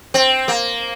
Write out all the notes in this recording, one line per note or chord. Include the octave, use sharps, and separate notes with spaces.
C4
A#3